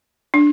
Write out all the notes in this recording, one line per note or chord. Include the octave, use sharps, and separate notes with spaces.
D4